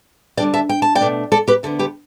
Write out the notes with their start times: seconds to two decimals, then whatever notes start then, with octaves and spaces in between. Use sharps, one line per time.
0.37 D3 G3 D4 D5 G5
0.54 E5 A5
0.69 G5
0.82 A5
0.95 D5 G5
1.01 B2 A3 D4
1.32 A4 D5
1.48 G4 B4
1.63 D2 D3 B3 A4
1.79 G4 B4